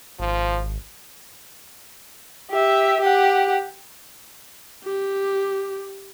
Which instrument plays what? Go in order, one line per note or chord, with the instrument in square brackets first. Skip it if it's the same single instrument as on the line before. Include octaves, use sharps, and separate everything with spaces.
[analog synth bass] G#1 [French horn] F3
[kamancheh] G4 E5
G4 F#5
[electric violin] G4